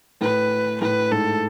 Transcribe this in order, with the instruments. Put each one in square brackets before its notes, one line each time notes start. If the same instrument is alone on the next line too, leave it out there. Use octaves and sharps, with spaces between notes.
[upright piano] A2 [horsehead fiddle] B4
[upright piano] A2 [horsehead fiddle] B4
[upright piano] G#2 [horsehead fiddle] A4